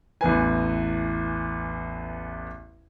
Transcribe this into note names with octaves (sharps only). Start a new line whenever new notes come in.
A1 E2 B4 G#5